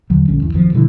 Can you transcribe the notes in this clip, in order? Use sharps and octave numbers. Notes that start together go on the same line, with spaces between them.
E2 D3 F#3
A#1 D3 G3 C#4
G1 E2
A1 F2 D#3 F3
B2 D3 E3 G3